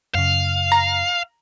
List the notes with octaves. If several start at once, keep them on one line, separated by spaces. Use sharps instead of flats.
F#2 C#3 F5
A#5